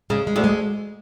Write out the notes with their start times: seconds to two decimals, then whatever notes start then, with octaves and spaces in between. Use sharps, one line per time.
0.10 C#3 G#3
0.27 G#3
0.36 D2 D3
0.44 G#3